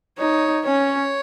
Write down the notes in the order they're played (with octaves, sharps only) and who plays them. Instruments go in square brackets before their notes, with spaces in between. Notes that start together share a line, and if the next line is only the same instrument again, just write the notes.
[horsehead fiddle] D#4 [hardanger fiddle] C#5
[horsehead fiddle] C#4 [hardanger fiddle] C#5